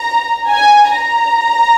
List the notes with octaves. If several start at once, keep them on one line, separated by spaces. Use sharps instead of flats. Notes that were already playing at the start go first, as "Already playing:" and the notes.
Already playing: A#5
G#5
A#5